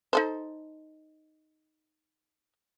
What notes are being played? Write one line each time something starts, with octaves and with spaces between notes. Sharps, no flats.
D#4 A4 C5